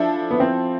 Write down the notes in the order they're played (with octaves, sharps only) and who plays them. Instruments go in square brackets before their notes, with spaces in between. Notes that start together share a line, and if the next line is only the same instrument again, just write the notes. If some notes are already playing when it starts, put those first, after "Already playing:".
Already playing: [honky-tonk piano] F3 E4 A4 [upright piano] D4
[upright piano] B3
C4